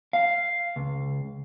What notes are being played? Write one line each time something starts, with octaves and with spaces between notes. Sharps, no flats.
F5
C#2